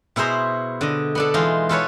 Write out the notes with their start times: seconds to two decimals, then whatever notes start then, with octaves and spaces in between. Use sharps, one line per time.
0.16 B2 E4 G#4 C5 A#5
0.81 D3 D#5
1.15 B3 D4 A4
1.34 E3 G#3 D#4 F4
1.69 F4 A4 B4 C#5